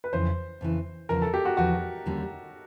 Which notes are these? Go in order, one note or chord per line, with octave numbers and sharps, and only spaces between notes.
B4
F2 C#3 E3 C5
F2 C#3 E3
E2 C#3 F3 A#4
A4
G4
F#4
E2 C#3 F3 F#4
D#2 D3 G3 A#3 C#4